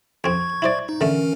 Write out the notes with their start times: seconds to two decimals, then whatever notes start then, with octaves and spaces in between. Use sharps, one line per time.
0.24 F2 C4 C#6 G#6
0.62 E4 C5 D5
0.89 D#4
1.01 D3 E3 A3 C#4 A#4